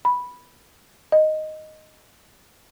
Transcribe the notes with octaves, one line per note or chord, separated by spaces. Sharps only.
B5
D#5